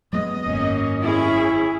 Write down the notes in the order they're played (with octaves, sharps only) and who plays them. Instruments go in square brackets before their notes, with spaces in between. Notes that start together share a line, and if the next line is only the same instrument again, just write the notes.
[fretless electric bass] F#3 G#3 B3 [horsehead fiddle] D#5
[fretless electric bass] G#1 F#2 [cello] A#3 C#4
[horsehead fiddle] C#4 G#4 [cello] E4